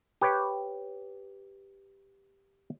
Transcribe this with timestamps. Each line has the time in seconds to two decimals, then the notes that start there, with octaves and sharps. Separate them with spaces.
0.21 G4 B4 C#5 G5